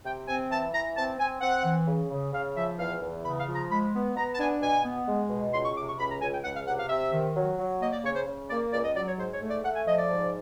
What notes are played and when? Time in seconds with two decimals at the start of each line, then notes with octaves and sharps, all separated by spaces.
0.04 C3 G5
0.27 C4 G#5
0.50 E3 A5
0.73 E3 A#5
0.95 C4 A5
1.18 C4 G#5
1.41 C4 F#5
1.64 E3
1.87 C#3
2.10 C#3
2.32 C#3 F5
2.55 F3 E5
2.78 E2 F5
3.01 E2
3.24 C#3 B5
3.39 F5
3.47 F3
3.54 A#5
3.69 G#3 B5
3.92 B3
4.15 B3 A#5
4.33 A5
4.38 D4 G#5
4.61 B2 G#5
4.84 B3
5.07 G#3
5.29 B2
5.52 C#2 C6
5.63 C#6
5.75 C3 D6
5.87 C#6
5.98 C#2 B5
6.09 A#5
6.21 C#2 G#5
6.32 G5
6.43 C#2 F#5
6.55 F5
6.66 C3 F#5
6.77 F5
6.89 C3 E5
7.12 D#3
7.35 F#3
7.58 F#3
7.80 A#3 D#5
7.92 D5
8.03 C#3 C#5
8.15 C5
8.26 C#3
8.49 A#3 D5
8.72 C#2 D5
8.83 D#5
8.94 F#3 D5
9.06 C#5
9.17 G#2 C5
9.33 C#5
9.40 A3
9.48 D5
9.63 A3 F#5
9.75 G#5
9.86 F3 D#5
9.98 D5
10.09 G#2